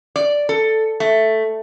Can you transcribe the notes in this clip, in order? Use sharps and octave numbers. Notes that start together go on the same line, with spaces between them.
D5
A4
A3